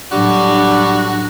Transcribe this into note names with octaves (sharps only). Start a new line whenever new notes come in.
A2 F#3 G3 D4 F#4